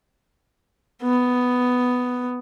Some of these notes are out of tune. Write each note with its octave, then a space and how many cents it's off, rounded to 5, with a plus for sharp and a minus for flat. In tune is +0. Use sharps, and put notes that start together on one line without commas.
B3 +5